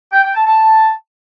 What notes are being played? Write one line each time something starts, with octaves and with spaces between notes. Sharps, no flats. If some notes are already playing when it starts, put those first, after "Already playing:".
G5
G5
A5
A5